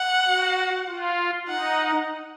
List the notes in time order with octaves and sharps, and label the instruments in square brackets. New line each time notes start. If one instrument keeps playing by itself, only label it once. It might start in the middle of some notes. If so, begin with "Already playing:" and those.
Already playing: [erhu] F#5
[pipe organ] F#4
F4
[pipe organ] D#4 [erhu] F#5